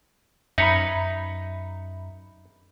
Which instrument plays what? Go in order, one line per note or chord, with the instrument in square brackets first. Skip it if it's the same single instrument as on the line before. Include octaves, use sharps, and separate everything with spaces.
[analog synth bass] F#2 [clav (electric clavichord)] D#4 B4 C#5 [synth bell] E5 A#5 B5